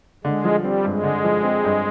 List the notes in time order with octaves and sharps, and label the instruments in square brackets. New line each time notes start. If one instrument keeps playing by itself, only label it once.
[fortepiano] D3 [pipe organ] G#3
[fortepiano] F3
[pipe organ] G3
[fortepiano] C4
[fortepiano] G2 [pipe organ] G#3
[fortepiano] D3
F3
C4
G2